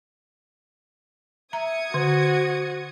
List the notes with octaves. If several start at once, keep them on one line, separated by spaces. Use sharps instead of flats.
E5 A#5 D#6 G#6 C#7
D3 F#4 C5